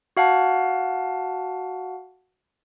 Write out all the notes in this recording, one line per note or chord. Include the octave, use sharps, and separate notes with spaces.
F#4 F5 F#5 A5